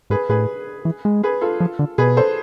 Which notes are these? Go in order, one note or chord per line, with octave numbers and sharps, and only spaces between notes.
G#2 G#4 B4
A2 G#4 B4
E3
G#3
G#4 B4
F4 A4
F3
D3
B2 G#4 B4
A4 C5